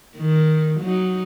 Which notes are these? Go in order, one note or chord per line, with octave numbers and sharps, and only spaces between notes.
D#3
F#3 D#4